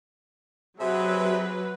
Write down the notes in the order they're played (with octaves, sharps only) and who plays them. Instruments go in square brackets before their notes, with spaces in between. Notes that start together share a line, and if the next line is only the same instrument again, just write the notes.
[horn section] C3 G#4 E5 [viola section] F#3 B4